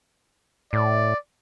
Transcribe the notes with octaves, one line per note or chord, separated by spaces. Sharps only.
A2 D5